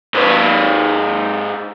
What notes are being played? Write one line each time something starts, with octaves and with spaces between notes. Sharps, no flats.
G#2 B4